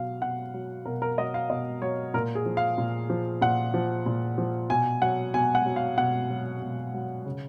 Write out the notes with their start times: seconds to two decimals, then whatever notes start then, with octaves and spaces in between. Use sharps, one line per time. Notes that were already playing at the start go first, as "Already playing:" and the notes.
Already playing: B2 F#3 F5
0.22 B2 F#5
0.54 F#3
0.85 B2 A#4
1.02 A#4
1.18 F#3 D#5
1.34 F5
1.50 B2 D#5
1.82 F#3 C#5
2.14 A#2 A#4
2.35 G#4
2.46 F3
2.57 F5
2.78 A#2
3.10 F3
3.41 A#2 F#5
3.74 F3
4.06 A#2
4.38 F3
4.70 B2 G#5
5.02 F#3 F#5
5.34 B2 G#5
5.55 F#5
5.66 F#3
5.76 F5
5.98 B2 F#5
6.30 F#3
6.62 B2
6.94 F#3
7.26 C#3